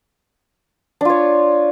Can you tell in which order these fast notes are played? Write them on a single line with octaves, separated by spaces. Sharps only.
D4 F4 C#5